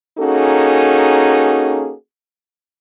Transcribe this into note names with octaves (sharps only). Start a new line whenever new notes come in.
A#3 C#4 D#4 F#4 G#4 A4